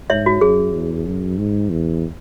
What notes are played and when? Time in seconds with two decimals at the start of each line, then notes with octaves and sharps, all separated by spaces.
0.10 G#2 C#5 E5
0.26 F#4
0.41 F#2 G#4
0.74 E2
1.06 F#2
1.38 G#2
1.71 E2